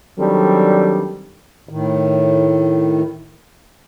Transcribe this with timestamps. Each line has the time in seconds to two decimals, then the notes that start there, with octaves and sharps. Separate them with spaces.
0.18 D#3 F#3 G3 C4 D4 A4
1.69 A2 D#3